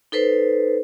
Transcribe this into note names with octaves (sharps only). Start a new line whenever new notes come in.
D#4 A4 B4 C5